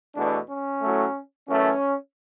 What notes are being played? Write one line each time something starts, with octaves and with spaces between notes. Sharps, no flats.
E2 B2 A3 D4
C#4
A2 F#3 A3
F#2 E3 A3 C#4